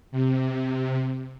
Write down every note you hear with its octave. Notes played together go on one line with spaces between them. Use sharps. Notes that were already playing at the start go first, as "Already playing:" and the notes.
C3